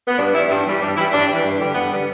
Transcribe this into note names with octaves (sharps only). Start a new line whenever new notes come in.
B3
G2 D4
E3 G3 E4
G2
E3 G3
G2 D4
E3 G3 E4
G2 D4
E3 G3
G2
D3 G3
G2 B3
D3 G3